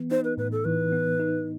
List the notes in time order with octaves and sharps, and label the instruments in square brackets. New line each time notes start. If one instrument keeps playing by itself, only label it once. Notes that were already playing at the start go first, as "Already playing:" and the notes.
Already playing: [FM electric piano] E3 B3
[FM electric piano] D#4 [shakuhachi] C5
[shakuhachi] B4
[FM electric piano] A2 [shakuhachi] B4
[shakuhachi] A4
[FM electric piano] E3 [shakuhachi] B4
[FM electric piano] B3
D#4